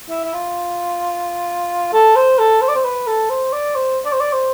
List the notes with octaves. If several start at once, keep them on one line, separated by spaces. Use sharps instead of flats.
E4
E4
F4
A4
C5
A4
C5
D5
C5
B4
A4
C5
D5
C5
D5
C5
D5
C5